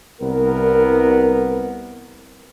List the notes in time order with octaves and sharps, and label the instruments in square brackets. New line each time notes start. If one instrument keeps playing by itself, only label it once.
[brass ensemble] C2 B3 A#4